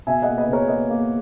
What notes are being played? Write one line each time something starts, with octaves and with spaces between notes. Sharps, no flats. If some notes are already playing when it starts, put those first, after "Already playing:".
B2 E5 G#5
D#5 F#5
A#3
B4 D#5
B2
A#4 C#5
A#3 B4 D#5
A#3